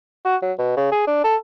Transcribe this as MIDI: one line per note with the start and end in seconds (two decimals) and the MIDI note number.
0.25 0.36 66
0.42 0.52 54
0.59 0.73 47
0.76 0.90 49
0.92 1.07 68
1.07 1.20 62
1.24 1.36 69